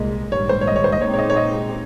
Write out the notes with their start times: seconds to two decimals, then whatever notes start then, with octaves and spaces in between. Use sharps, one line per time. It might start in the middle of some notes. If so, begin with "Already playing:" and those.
Already playing: C2 A#2 G#3 D#5
0.32 A#1 G#2 D#3 G3 C#5
0.49 C5
0.61 C#5
0.67 D#5
0.76 C#5
0.84 C5
0.92 D#5
1.01 A#2 G#3 C4 D#4 G4 C#5
1.13 C#5
1.18 D#5
1.30 C#5
1.37 D#5